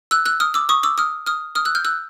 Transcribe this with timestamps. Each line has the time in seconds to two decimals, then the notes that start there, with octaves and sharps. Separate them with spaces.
0.11 E6 F#6
0.26 E6 F#6
0.40 D#6 F6
0.54 D6 E6
0.69 C#6 D#6
0.83 D6 E6
0.98 D#6 F6
1.26 D#6 F6
1.55 D#6 F6
1.65 E6 F#6
1.75 F6 G6
1.85 E6 F#6